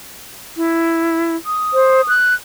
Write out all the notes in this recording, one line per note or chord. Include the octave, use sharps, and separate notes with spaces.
E4
D#6
C5
F#6